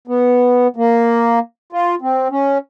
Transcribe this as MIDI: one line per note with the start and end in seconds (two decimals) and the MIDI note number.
0.07 0.67 59
0.76 1.39 58
1.73 1.95 65
2.01 2.28 60
2.30 2.58 61